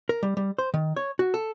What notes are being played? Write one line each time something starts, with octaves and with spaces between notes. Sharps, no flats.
A#4
G3
G3
C5
D#3
C#5
F#4
A4